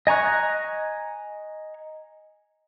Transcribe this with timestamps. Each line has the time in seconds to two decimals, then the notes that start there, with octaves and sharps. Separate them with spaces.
0.07 D#5 G#5 A#5 C#6 F#6